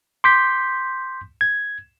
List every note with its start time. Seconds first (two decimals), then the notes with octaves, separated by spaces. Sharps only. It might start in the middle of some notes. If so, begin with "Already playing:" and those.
0.24 C6 D6 G6 B6
1.41 G#6